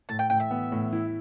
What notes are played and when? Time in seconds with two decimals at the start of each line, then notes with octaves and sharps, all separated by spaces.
0.09 A2 A5
0.19 G5
0.30 A2 G5
0.40 E5
0.51 B3
0.72 A2
0.93 E4